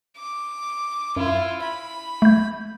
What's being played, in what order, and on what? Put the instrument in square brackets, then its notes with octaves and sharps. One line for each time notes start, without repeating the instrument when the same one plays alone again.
[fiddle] D6
[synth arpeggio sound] F#2 [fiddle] E4 F4
[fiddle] B5
[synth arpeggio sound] A3 G6